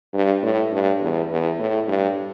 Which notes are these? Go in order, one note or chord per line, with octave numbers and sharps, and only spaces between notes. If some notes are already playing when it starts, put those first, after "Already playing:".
G2
A2
G2
E2
E2
A2
G2